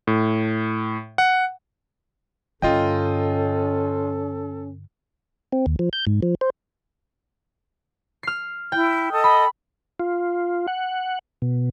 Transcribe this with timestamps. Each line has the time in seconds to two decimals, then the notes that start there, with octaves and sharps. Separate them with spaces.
0.07 A2
1.18 F#5
2.62 G2 D3 C#4 F4 A4 D#5 G5
5.53 C4
5.66 D#2
5.79 F3
5.93 G6
6.07 G#2
6.22 F3
6.41 C5
8.23 F6 C7
8.72 E4 G5
9.11 A4 D#5 D#6
9.24 B5
10.00 F4
10.68 F#5
11.42 B2